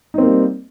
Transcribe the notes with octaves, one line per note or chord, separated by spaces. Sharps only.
G3 A#3 C4 D#4